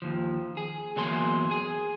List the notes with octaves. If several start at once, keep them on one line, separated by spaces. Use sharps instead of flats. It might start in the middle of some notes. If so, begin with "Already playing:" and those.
D#2 F3
G#4
E2 F#3 A#3 G#5 C6
G#4 G#5